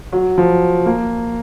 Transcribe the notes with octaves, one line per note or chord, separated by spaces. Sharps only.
F#3
F3
A#3